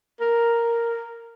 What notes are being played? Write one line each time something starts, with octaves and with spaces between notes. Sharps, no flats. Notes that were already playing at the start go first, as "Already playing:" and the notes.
A#4